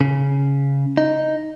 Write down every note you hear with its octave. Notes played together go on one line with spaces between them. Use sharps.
C#3
D#4